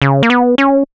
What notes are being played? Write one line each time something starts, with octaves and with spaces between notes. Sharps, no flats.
C#3
A#3
B3
C#4